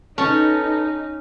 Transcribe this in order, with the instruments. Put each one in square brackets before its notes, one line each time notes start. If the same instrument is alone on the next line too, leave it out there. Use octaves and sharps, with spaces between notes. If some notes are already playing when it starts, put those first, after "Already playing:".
[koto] C#4 C#5 [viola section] D#4 [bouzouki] A4 B4 A5